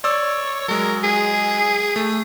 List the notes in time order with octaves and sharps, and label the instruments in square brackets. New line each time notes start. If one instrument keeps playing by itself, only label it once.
[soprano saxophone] C#5 [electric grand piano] D5 E6
[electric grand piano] F#3 G#3 [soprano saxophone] A#4
[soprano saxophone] G#4
[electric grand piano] A3